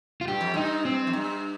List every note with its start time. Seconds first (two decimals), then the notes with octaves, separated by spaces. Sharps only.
0.21 F4
0.28 G2 G4
0.41 F2
0.54 G2 D#4
0.85 C4
1.07 F2
1.13 G2